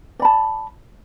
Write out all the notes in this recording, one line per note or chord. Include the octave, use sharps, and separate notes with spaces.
D5 A5 B5